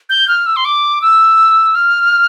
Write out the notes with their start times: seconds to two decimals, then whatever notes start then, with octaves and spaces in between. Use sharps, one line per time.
0.10 G6
0.28 F6
0.46 E6
0.56 C6
0.65 D6
1.02 E6
1.75 F6